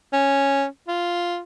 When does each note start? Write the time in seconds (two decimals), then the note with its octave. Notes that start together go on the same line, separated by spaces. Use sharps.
0.13 C#4
0.88 F4